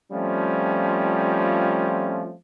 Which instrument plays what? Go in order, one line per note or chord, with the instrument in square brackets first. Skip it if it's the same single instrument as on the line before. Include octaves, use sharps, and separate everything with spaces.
[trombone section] F3 G3 A3 C4 C#4 F4